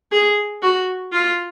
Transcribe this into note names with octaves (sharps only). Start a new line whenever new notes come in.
G#4
F#4
F4